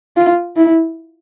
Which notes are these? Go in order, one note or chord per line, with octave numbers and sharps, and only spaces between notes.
F4
E4